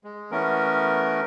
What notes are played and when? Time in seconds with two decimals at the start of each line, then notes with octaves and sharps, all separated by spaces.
0.04 G#3
0.31 E3 A3 B3 C#4 A#4